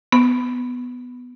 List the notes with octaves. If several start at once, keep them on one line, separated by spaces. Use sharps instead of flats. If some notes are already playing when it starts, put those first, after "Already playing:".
B3